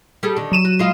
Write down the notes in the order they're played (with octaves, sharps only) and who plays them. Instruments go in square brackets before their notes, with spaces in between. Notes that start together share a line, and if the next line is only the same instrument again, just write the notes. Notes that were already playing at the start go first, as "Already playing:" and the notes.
[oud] G3 G#4 A4
D3 D#3
[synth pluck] F#3 D#7 E7
[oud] F#4
G#3 F4 F5